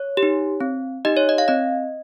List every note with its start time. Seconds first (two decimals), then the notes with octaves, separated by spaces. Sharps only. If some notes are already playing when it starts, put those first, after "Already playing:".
Already playing: C#5
0.17 G4
0.23 D#4
0.61 C4
1.05 D#4 G4 D#5
1.17 C#5
1.29 D#5
1.38 F5
1.48 C4 D#5